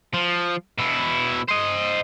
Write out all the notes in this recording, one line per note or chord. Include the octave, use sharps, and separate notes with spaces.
F3
B2 E4
C5 D#5